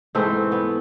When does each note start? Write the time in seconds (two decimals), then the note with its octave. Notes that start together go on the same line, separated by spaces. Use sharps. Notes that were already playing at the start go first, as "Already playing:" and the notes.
0.15 G#2 E3 A3 C4
0.52 B3